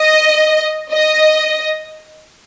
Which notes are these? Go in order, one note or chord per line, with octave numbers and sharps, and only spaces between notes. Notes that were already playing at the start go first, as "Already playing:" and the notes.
Already playing: D#5
D#5